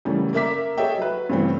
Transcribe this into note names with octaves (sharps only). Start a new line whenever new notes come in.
F#2 C#3 E3 G3 A3
A#3 A#4 E5 D6 B6
G#4 A4 C#5 D#5 E5 G5
F#3 B4
G2 C#3 E3 A3 C4